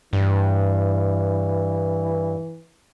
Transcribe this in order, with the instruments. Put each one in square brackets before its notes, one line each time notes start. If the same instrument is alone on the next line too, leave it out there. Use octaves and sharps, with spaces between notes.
[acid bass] G2 [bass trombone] E3